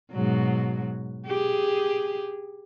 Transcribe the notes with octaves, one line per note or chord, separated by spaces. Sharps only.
G#2 B2 F#3
G4 G#4